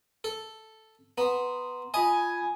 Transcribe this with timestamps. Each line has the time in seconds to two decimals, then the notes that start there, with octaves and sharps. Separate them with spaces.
0.24 A4
1.18 B3 A#5 C6
1.94 F4 D#5 G#5 B5 D#6